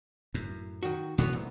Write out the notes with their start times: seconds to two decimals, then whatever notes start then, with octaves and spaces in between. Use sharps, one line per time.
0.34 F#2 A2
0.83 D#3 F#4
1.18 B2 E3 A3 B3 F#4 C#5
1.33 C2